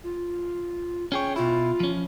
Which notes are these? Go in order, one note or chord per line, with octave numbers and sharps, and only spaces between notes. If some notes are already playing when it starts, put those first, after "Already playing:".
F4
C#4 G#4 C#5 G5
B2 E4 F4
F3 C#4